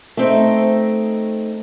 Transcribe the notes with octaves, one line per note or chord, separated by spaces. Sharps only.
A3 C4 D#4